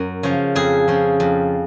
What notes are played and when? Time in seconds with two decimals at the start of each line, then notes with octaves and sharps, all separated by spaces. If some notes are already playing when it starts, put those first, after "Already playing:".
Already playing: F#2 A#4
0.23 C#3 F3
0.55 F2 G#4
0.88 C#3 F3
1.20 F2